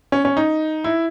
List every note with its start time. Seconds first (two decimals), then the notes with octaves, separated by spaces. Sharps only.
0.12 C#4
0.25 C#4
0.37 D#4
0.84 E4